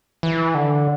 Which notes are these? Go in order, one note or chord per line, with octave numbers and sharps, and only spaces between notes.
E3
D3